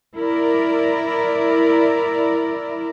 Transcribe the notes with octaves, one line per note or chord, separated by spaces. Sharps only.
E4 A#4 D5